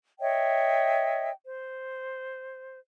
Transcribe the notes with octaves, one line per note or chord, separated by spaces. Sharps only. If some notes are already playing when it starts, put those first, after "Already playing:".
C#5 D#5 E5 G5
C5